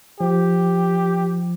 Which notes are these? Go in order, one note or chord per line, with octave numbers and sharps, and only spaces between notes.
F3 G4